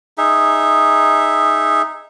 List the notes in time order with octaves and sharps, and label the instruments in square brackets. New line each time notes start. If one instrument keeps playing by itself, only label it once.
[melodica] D#4 G#4 E5